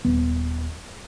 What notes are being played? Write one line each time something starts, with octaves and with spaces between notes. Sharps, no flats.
D#1 B3